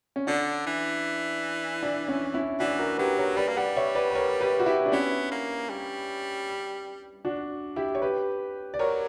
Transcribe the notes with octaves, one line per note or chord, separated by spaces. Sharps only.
C#4
D3 D4
E3
D4
C#4
C#4 E4
E3 D4 F#4
F#4 A#4
F#3 G4 B4
A#4 C#5
G3 B4 D5
A#3
G3 D5 F#5
C#5 E5
B4 D5
B4
A#4 C#5
G4 B4
F#4
E4 G4
D4
B3 C#4 E4
A#3
G3
D4 F#4
E4 G4
C#5
G4 B4
D5
F#3 A#4 C#5